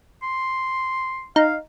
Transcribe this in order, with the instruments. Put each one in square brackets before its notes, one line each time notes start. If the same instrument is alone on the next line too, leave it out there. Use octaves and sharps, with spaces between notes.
[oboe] C6
[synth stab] D#4 [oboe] F5